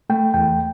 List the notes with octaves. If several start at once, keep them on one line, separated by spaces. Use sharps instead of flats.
A3 G5
E2 G5